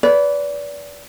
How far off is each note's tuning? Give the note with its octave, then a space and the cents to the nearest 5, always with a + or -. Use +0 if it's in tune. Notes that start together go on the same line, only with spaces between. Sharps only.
B4 +0 D5 -25